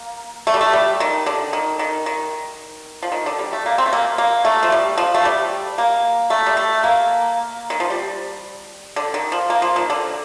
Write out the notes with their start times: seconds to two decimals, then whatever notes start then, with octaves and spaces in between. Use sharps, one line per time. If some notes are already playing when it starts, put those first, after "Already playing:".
Already playing: A#3
0.47 A3
0.54 G3
0.61 A3
0.73 G3
1.00 D#3
1.26 D3
1.53 D#3
1.79 D#3
2.06 D#3
3.03 F3
3.12 D#3
3.26 D3
3.39 G3
3.53 A3
3.66 A#3
3.78 C4
3.86 A3
3.93 A#3
4.18 A#3
4.45 A3
4.63 F3
4.72 G3
4.98 F3
5.14 A3
5.25 G3
5.78 A#3
6.30 A3
6.46 G3
6.57 A3
6.84 A#3
7.70 D#3
7.80 F3
7.90 G3
8.96 D3
9.14 D#3
9.32 F3
9.50 A#3
9.62 F3
9.76 D#3
9.90 D3